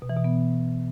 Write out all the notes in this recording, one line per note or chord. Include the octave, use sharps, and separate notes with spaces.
B2
E3
B2
B3